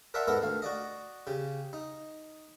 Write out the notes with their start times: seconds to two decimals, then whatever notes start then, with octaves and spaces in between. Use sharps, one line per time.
0.14 A#4 D5 E5 F#5 A5 C6
0.27 G#2 B3 A4 A#4 F#5
0.42 D2 F5
0.62 F#4 D5 D#5
1.27 C#3 G4
1.73 D#4